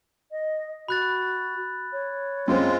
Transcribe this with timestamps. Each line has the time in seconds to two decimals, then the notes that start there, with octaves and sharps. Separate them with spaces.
0.32 D#5
0.88 F#4 B5 F#6 A6
1.93 C#5
2.48 F#2 G#3 C4 F4